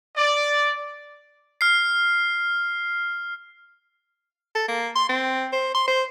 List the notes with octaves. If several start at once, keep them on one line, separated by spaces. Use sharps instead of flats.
D5
F6 C7
A4
A#3
C6
C4
C5
C6
C5